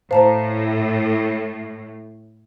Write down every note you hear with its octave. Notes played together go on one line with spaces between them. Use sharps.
A2 C5 F5 A5 A#5